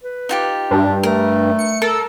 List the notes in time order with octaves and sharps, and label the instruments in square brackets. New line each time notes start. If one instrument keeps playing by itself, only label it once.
[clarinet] B4
[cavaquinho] D#4 F4 G4
[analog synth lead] G2 [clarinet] D4
[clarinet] A3 [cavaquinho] A#4
[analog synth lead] C#7
[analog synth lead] A4 [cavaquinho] A#4